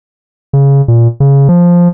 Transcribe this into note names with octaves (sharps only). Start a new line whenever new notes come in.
C#3
A#2
C#3
F3